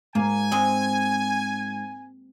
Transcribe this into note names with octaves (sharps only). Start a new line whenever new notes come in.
G#2 A#3 G#5
G#3 C4 G#4